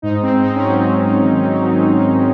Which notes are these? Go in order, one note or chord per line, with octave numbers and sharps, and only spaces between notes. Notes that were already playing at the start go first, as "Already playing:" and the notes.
G#2 D#4
G#2 C4
G#2 D#4
C#4
F#3 C4
F#3 C#4
G#2
D#3
D#3
F#3
F#3
G#2